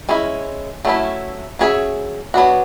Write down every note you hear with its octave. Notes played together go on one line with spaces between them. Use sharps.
G#3 C#4 E4
F#3 A3 C#4 E4
F#3 C#4 G#4 C#5 E5
F#3 B3 D4 F#4